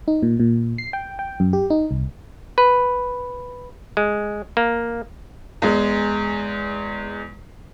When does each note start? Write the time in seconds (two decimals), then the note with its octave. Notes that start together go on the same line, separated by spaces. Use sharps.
0.08 D#4
0.23 A#2
0.40 A#2
0.78 C7
0.93 G5
1.19 G5
1.40 F#2
1.53 G4
1.70 D#4
1.91 C2
2.58 B4
3.97 G#3
4.57 A#3
5.62 E2 G#3